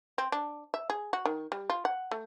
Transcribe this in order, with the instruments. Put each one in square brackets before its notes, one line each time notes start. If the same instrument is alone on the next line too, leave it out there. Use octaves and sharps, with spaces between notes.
[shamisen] C4
D4
E5
G#4
F#4
D#3
G3
F4
F#5
A3